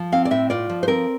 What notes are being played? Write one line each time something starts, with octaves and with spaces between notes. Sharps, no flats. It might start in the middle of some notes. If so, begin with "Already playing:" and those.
Already playing: F3
C4 F5
D5
A2 E5
F4 D5
F3
C5
C4 A#4